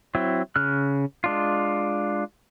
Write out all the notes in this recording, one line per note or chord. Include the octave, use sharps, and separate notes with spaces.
F#3 C4 E4
C#3 F6 F#6
G#3 D4 F4